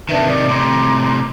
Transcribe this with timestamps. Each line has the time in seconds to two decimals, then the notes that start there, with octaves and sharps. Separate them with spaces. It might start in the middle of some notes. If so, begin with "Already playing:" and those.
0.09 C3 D#3 D4 B4 E5
0.28 D#4 D5 D6
0.48 A2 C3 A#5 C6 D6